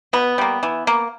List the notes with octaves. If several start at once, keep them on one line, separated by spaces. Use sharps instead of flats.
B2 B3
G3 A#3
E3
A#3